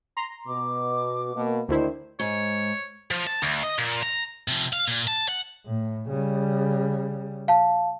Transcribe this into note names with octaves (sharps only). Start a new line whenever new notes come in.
A#5 C6
B2 D6
B2 A#3
D2 D#3 D4 E4 C5
G#2 C#5
F3
A5
D2
D#5
A#2
A#5
C3 F3
F5
A#2
A5
F#5
A2
C#3 G3
F5 A5